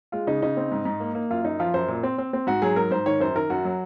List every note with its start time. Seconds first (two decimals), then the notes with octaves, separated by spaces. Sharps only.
0.12 G#3 F4
0.27 C#3 D#4
0.42 C#3 D#4
0.57 C4
0.72 G#2
0.85 G#2
1.00 A#3
1.15 A#3
1.30 F#2 F4
1.44 F#2 D#4
1.60 F3 F4
1.74 F#2 C5
1.88 A#2
2.03 C4
2.18 C4
2.33 C4
2.47 G#2 F#4
2.62 F#3 G#4
2.76 G#2 A#4
2.91 G#2 C5
3.06 D#3 C#5
3.20 F#2 C5
3.35 D#3 A#4
3.50 F#2 F#4
3.65 F#3